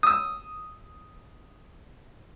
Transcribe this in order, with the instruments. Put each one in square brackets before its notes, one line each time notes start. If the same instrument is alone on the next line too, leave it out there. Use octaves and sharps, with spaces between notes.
[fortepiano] D#6 E6